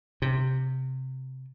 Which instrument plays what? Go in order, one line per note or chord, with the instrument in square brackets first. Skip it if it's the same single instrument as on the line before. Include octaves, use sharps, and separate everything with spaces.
[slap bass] C3